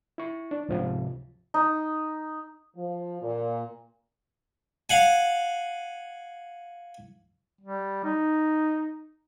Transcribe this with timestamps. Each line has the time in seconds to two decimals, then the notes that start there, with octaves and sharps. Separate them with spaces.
0.18 E4 C#6
0.51 D4
0.69 C#2 G#2 C3 F3
1.54 D#4
2.76 F3
3.22 A#2
4.90 F5 F#5 G#5
7.61 G3
8.04 D#4